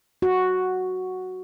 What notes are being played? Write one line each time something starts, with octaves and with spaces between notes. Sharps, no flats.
F#4